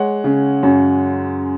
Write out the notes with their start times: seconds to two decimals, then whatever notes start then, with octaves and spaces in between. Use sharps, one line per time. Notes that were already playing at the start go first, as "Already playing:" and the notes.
Already playing: G#3 C#5 F#5
0.24 C#3
0.63 F#2